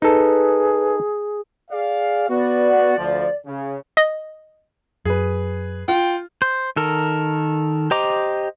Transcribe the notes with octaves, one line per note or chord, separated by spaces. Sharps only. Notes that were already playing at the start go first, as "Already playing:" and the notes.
D#4 G#4 A4 B4
G#4 D5 F5
B3 F#4 D5
D2 F3
C#3
D#5
F#2 G#4 B4
F4 G5
C5
D#3 A4 A#4
G4 C5 D#5 A#5 D6